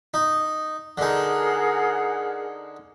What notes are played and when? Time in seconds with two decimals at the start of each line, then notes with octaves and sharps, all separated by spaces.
0.14 D#4
0.98 D3 D#4 G#4 A#4 F#5